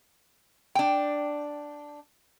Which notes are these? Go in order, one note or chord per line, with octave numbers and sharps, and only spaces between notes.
D4 G5